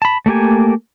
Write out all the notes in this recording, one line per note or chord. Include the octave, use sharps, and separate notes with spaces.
A5 B5
A3 A#3 G4 G#5